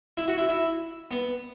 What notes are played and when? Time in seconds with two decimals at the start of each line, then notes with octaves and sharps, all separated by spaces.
0.17 E4
0.28 F#4
0.38 E4
0.49 E4
1.11 B3